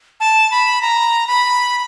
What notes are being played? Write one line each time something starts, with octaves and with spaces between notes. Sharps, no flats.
A5
B5
A#5
B5